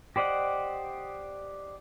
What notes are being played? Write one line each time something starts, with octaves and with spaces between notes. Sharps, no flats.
G4 C5 D5 D#5 F#5